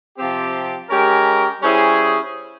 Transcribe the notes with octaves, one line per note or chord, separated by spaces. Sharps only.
C3 F3 C4 G4
G#3 C#4 G4 A#4
G3 C#4 E4 G#4 C5